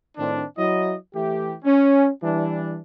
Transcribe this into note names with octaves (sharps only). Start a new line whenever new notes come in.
A2 D#3 C4 D4
F#3 E4 D#5
E3 A3 E4 G4
C#4
E3 G3 D4